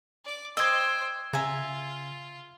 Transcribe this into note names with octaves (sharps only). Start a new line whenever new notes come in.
D5 D6
C5 D#5 G5 C6 D6 E6 G#6
C#3 F4 E5 G#5 A#5